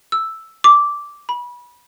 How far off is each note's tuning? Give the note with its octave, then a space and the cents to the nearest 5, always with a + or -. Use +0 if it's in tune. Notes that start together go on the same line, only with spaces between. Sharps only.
E6 +0
D6 -10
B5 -25